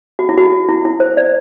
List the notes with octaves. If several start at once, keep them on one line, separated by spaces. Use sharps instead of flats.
F#4
E4
F#4
E4
E4
C5
D5